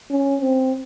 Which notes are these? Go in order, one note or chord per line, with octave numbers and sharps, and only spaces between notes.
C#4
C4